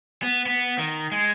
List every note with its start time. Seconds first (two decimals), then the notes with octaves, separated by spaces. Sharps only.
0.23 B3
0.46 B3
0.79 D#3
1.12 G#3